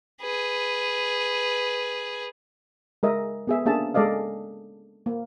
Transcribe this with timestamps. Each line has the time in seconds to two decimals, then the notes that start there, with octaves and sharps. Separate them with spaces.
0.21 G#4 B4
3.03 G#3 A#4 D#5 E5
3.47 B3 G#4 E5
3.66 A#3 C#4 D4 G#4 E5 A5
3.94 G#3 A4 D5 D#5 F5
5.06 A#3